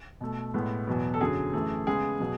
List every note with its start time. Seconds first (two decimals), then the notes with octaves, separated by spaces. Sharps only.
0.21 B2 A3
0.54 A2 G#3 B3
0.87 E2 B2 F#3 B3
1.14 A4
1.20 F#2 D3 F#3 G#4
1.53 F#2 E3 A3
1.87 C#3 G#3 B3 G#4
2.20 B2 F#3 B3